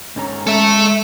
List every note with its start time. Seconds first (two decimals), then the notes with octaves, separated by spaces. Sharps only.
0.16 G#2 C#4 A#5
0.47 G#3 A4 E5